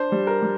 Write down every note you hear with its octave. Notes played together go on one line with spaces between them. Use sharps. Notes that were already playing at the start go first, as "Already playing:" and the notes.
Already playing: D4 C5
G3
A#4
G3